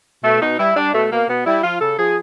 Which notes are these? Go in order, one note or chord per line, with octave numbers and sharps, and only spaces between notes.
B2 A3
B2 D#4
G3 E4
G3 D4
B2 A3
B2 A#3
B2 B3
G3 E4
F3 F4
C#3 A4
F3 G#4